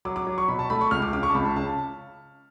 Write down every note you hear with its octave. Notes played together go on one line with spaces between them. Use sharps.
F#3 D6
D6
F#3
C#6
B2 B5
A5
A3 B5
C#6
C#2 F6
D6
C#3 D6
C#6
A5
C#2 B5
A5
C#3 A5